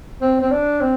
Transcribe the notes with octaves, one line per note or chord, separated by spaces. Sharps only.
C4
C4
D4
C4